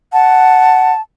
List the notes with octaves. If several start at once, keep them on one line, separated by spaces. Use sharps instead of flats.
F#5 A5